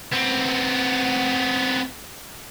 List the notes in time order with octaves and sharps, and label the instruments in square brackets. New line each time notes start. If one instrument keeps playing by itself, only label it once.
[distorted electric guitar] B3 C4